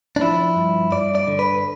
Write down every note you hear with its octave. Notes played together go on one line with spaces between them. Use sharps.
D4
F3 E4
G2
G2 D5
D5
D3
B4